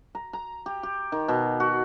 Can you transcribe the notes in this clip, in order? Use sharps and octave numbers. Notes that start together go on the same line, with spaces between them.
A#5
A#5
G4
G4
D#3
B2
F#4